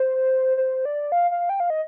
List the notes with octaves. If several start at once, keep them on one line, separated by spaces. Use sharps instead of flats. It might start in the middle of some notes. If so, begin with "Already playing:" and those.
Already playing: C5
C5
D5
F5
F5
G5
F5
D#5